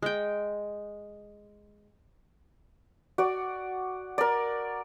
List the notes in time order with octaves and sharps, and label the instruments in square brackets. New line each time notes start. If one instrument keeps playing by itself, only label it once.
[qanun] G#3 G5
[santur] F#4 D5
A#4 D5